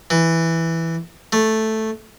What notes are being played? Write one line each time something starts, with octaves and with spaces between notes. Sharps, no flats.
E3
A3